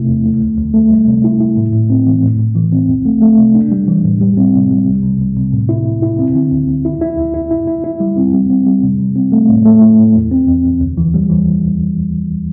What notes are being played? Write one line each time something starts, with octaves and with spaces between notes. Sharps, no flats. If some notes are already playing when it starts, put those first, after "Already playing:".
Already playing: C3 A3 E4
E2
A3
D2
D2
A3
G3
C3
E4
E4
A2
A2
C4
E3
A2
A2
E3
C4
C2
A3
A3
C3
D4
G3
E3
A2
G3
C4
C3
G3
C2
C3
C2
C3
A2
E4
A2
E4
C4
D3
D2
D2
E4
E4
D2
E4
E4
E4
E4
G3
C4
G3
C4
G3
C3
C3
C4
A3
A2
A3
E4
A2
E2
C4
E2
E2
D2
E3
G3
E3